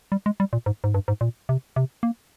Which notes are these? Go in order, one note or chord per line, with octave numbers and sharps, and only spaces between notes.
G3
G#3
G3
A#2
G#2
G#2
G2
G#2
A#2
C3
C3
A#3